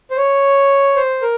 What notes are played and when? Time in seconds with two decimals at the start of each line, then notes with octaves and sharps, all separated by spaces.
0.11 C5
0.17 C#5
0.96 C5
1.22 A#4